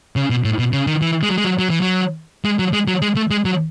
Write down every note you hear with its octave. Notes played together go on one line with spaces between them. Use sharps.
C#3
B2
A2
B2
C#3
D#3
E3
G#3
F#3
G#3
F#3
F#3
E3
F#3
G#3
F#3
G#3
F#3
G#3
A3
G#3
F#3